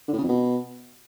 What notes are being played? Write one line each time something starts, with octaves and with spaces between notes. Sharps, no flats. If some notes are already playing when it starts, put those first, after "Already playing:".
D3
A2
C#3
F2
B2